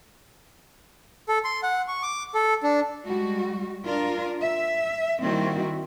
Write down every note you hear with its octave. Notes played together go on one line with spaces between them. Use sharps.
A4
C6
F#5
C#6
D6
A4
D4
G3 G#3 F#4
D4 F4 A#4
E5
D#3 G3 A#3 C4 E4 F#4